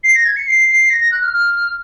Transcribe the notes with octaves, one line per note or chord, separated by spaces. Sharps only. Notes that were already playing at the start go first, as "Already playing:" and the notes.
C7
A#6
G#6
C#7
C7
C7
A#6
A#6
F#6
F6
F6